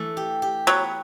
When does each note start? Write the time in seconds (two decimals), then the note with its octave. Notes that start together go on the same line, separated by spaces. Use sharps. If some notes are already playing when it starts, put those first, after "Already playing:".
Already playing: E3 A3
0.17 G4
0.42 G4
0.67 F#3 B3